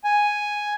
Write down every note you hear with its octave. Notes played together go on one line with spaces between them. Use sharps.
G#5